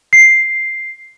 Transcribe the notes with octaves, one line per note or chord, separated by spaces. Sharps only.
C7